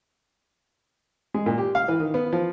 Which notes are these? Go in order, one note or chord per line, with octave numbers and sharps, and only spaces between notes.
G#3
A#2
G4
F5
E3
D#3
B3
F3